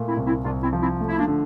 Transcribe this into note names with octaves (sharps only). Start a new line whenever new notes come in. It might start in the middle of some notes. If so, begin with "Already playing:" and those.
Already playing: A#2 A3
C4 E4
C2
C4 E4
C2 D4 F4
C4 E4
F3
C4 E4
A3
E4
A#3 D4
D3